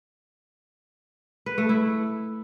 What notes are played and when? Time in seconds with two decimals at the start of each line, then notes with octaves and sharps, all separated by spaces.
1.46 B4
1.58 A3
1.69 E4